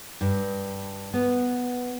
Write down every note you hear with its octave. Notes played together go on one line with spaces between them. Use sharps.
G2
B3